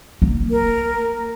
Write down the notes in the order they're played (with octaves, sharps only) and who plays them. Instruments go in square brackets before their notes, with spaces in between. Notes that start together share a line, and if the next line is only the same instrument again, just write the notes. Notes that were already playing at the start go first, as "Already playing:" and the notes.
[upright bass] A#3
[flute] A#4